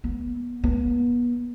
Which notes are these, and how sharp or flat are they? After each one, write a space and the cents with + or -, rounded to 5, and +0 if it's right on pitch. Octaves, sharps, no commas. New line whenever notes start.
B3 -25
B3 -35